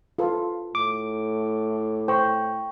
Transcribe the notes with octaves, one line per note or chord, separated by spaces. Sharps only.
F4 A4 B4
A2 D6
C5 G5 C#6